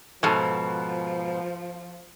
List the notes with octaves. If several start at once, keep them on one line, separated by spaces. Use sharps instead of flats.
G#2 B2 F3 A4 F#5 G#5